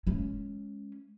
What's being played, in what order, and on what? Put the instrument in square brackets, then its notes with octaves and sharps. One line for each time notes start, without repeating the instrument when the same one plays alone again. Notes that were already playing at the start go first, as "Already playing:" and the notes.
[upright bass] G#3 C#4